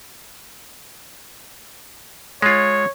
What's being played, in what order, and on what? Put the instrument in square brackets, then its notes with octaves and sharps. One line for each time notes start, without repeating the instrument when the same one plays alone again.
[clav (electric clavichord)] G#3 F4 [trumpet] C#5